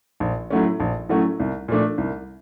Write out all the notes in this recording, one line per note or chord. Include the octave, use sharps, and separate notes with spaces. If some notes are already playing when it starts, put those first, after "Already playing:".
A#1
A2 F#3 A3 C#4
A#1
A2 F#3 A3 C#4
C2
A#2 F3 A3 D4
C2